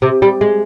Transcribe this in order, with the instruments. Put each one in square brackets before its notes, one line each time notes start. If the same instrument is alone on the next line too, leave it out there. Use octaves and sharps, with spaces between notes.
[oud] C3
G3
G#3